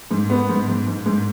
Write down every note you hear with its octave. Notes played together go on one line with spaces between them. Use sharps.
G#2
B3
G#2
G#2
G#2
G#2